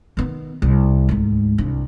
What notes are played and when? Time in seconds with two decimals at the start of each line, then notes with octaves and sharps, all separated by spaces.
0.17 D#3 B3
0.62 C2
1.09 D2 G#2
1.58 C2 D4